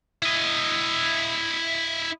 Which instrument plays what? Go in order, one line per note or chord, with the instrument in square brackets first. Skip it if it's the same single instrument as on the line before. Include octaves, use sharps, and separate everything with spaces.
[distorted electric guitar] E4 D#5